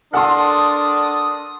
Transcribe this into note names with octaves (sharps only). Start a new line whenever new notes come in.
D4 A4 A#4 F#5 A5 C6 D#6